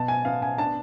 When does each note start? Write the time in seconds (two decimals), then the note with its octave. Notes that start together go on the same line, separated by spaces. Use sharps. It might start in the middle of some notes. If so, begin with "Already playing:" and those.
Already playing: B2 A5
0.08 G#5
0.25 B3 F5
0.42 G#5
0.58 D4 A5